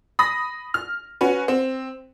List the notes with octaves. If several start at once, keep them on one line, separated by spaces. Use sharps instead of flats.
B5 D#6 A#6
F6
C#4 F#4 B4
C4